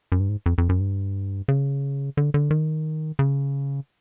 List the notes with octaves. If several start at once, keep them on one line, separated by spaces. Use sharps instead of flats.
F#2
G2
G#2
F2
F2
F#2
G2
C#3
D3
D3
D#3
C#3